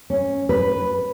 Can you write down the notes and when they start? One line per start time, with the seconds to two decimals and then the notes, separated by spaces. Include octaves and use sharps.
0.10 C#4
0.49 B4